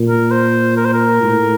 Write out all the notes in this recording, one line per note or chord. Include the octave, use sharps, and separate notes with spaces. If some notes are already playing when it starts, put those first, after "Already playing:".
Already playing: A#2
A#4
C5
A#4
C5
A#4
A2